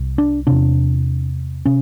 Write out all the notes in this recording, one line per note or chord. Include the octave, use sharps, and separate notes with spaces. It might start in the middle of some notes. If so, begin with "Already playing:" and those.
Already playing: C2 C3
D4
E2 C3 D4
C3 C#4